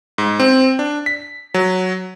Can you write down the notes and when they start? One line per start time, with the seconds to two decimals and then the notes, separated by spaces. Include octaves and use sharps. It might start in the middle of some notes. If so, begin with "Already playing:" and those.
0.18 G#2
0.40 C4
0.79 D4
1.06 B6
1.54 F#3